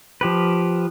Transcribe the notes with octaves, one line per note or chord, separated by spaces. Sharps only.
F3 G4 B4